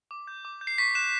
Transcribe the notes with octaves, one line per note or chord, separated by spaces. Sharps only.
D6
G6
D6
G6
C7
C#6 B6
F#6 E7